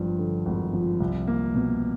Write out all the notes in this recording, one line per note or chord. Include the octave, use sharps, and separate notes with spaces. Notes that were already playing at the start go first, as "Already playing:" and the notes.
Already playing: G#1 G2 F3
D3
G#1
F3
C2
A#3
B2